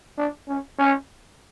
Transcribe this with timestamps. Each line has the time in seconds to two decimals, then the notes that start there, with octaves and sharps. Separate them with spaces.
0.18 D4
0.48 C#4
0.79 C#4